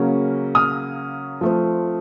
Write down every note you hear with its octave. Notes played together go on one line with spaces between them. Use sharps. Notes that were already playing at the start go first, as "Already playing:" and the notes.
Already playing: C#3 F#3 A#3 C#4
D#6 F6
F3 A3 C4